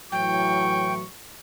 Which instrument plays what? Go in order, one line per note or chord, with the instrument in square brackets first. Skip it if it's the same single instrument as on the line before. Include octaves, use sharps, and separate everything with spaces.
[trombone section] A2 E3 F#3 [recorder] G5 [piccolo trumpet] C#6